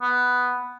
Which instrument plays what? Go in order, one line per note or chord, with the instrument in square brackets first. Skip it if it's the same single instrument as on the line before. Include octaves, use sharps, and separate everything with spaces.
[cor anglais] B3